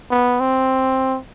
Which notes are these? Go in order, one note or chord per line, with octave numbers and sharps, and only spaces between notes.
B3
C4